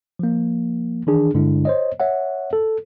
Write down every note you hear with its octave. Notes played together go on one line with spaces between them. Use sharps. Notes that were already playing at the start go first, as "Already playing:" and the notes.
F3 A#3
D#3 E3 D4 G#4
G2 D3 G#3 D4 E4
C5 C#5 D#5
C#5 E5 F#5
A4